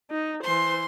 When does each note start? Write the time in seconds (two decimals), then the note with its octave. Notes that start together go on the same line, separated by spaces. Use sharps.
0.10 D#4
0.43 E3 C5 C6